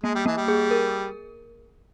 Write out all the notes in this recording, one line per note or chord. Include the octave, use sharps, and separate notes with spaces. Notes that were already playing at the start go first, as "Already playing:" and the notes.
G#3 A#3
G3
E3 A#3
G3
G#4
A#4